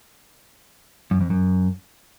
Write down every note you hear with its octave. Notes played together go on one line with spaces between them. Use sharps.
F#2
F2
F#2